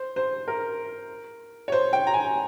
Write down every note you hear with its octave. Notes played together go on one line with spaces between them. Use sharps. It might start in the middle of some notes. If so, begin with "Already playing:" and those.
Already playing: C5
C5
A#4
C#5
C5
G5
A#5
G#5